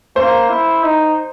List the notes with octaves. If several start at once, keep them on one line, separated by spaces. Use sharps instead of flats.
A#3 C5
E4
D#4